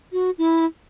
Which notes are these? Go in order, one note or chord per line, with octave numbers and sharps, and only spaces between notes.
F#4
E4